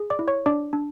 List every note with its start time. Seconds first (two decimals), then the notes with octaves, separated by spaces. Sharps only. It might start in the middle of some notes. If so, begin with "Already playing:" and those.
Already playing: G#4
0.10 D5 D6
0.19 E4
0.28 C#5 C#6
0.46 D4 D5 D6
0.73 D4